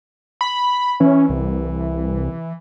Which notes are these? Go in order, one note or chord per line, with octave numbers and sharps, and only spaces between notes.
B5
E3 C#4
C2